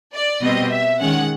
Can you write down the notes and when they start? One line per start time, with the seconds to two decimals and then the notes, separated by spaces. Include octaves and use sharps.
0.14 D5
0.43 B2 G3 C4 D#5
0.72 E5
1.00 D#3 G#3 C#4 F#5